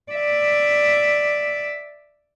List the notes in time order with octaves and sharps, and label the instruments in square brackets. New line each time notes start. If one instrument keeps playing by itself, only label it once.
[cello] D5 E5